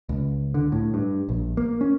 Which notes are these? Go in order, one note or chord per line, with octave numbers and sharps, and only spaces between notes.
C#2
D3
A2
G2
A#1
A#3
C#4